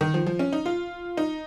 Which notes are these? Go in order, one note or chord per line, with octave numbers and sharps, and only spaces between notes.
D#3
F3
F3
C#4
D#4
F4
D#4